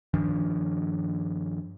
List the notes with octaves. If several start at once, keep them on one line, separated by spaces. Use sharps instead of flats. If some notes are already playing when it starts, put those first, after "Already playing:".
G2 D#3 F3 D4